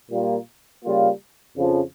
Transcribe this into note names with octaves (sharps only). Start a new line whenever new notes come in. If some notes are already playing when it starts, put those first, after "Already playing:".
A#2 G3 A#3 F4
C#3 G3 A#3 F4
F2 C#3 F3